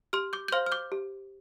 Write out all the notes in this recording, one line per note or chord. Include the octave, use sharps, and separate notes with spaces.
G4 C6 F6
D6 G6
G6
C5 F5 C6 F6
F6
D6 G6
G4